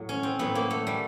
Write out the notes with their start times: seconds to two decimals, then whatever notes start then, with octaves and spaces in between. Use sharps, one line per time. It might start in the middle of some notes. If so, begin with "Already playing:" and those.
Already playing: A2 F#3
0.09 C#4
0.23 C4
0.39 A2 F#3 B3
0.55 A#3
0.70 A3
0.87 G3